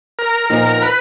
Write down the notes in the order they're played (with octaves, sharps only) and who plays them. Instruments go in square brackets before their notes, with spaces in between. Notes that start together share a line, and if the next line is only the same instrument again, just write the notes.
[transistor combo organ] A#4
[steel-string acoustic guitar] A#2 F3 B3 D#4 [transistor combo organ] A#4
[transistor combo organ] B4